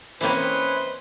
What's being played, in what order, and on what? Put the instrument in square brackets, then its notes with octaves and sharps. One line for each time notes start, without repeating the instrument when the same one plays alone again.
[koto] E3 A#3 C4 [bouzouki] C#4 D#4 E4 [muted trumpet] B4 [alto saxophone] C5